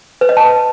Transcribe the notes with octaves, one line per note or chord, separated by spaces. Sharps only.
B4
D#5
A5